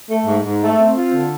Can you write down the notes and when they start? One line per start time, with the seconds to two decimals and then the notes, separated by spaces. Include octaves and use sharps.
0.09 A3
0.26 G#2
0.44 G#2
0.61 A3
0.79 C4
0.95 F4
1.13 D3